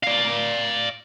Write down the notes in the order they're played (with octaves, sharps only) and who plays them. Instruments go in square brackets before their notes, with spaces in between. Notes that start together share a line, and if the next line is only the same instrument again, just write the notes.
[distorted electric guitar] D5 F5